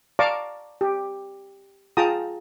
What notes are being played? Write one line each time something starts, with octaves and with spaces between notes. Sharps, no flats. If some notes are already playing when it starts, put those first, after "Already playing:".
D5 F5 A5 A#5 C#6 D6
G4
F4 G#4 G5 A5 A#5 D#6